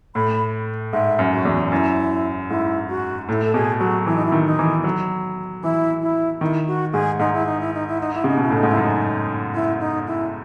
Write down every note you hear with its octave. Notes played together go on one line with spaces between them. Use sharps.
A2 B5
G#2 E5
F#2
F#4
E2
F#2 E4
G#2 E4
F#4
A2 E4
A4
B2 G#4
F#3 F#4
E3 E4
D#4
E4
D#3
D#4
E3
F#3
E3 E4
E4
D#3 E4
F#4
G#2 G#4
G#2 D#4
E4
D#4
E4
D#4
E4
D#4
E4
C#3 D#4
B2 E4
A2 D#4
G#2
E4
F#2
D#4
E4
D#4
E4